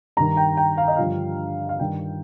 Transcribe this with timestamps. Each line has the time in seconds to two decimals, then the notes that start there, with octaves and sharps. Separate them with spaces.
0.17 G2 D#3 A#5
0.37 G5
0.57 G5
0.77 F5
0.88 D#5
0.96 G2 D3 F3 F5
1.69 F5
1.79 G2 D#3 G5